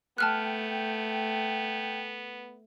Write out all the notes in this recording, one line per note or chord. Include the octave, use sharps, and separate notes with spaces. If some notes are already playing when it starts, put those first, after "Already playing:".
A3 B3 G5 A5 F6 F#6